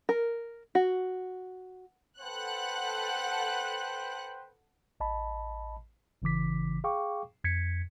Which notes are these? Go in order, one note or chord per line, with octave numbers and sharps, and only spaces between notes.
A#4
F#4
A4 B4 C5 F#5 G5 F#6
A1 D#5 A5 B5
G#1 C#3 E3 D6 B6
G#4 F5 G5 C#6 D6
F2 G#6 B6 C#7